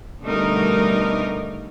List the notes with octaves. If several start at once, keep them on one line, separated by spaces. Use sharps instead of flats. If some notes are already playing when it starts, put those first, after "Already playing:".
B2 D3 G3 A3 D#4 A#4